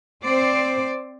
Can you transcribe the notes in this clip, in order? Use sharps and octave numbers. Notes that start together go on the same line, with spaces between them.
C4 C5 D5